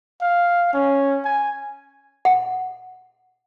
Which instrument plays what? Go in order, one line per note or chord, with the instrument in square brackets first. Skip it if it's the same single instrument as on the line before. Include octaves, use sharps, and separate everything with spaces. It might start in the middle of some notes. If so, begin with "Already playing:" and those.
[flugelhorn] F5
C#4
G#5
[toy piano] F#5